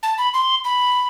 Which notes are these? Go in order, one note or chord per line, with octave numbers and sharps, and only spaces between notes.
A5
B5
C6
B5